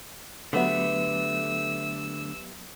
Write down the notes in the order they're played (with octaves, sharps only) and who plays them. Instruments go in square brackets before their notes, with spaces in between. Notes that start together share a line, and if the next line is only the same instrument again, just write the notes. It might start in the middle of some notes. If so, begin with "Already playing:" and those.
[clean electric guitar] D3 A3 [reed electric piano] F#3 B3 [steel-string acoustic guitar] G4 B4 E5 [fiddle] E6